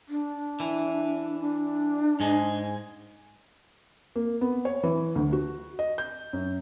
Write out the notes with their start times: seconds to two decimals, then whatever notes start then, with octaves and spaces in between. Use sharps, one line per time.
0.09 D4
0.60 E3
1.41 D4
2.20 G#2 G#3
4.16 A#3
4.41 B3
4.65 C#5
4.83 E3
5.16 D2
5.33 F#4
5.79 D#5
5.98 G6
6.33 F#2